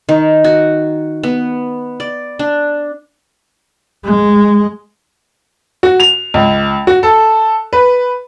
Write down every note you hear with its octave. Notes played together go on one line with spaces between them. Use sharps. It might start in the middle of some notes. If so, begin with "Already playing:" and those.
D#3
F#4
B3
D5
D4
G#3
F#4
F7
C#2
F#4
A4
B4